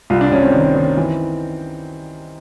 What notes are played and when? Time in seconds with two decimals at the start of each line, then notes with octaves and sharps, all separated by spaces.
0.10 C2 F4
0.21 D4
0.31 C2 C#4
0.43 C4
0.54 D#3
0.75 D#3
0.97 E3